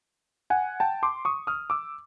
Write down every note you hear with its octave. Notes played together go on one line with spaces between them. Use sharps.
F#5 G#5
G5 A5
C6 D6
C#6 D#6
D#6 F6
D6 E6